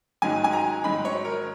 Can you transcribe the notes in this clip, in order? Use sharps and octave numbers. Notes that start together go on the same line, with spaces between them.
G#2 D#3 F#3 G#5
G#5
A#5
G#2 D#3 F#3 B5
C#5
A#4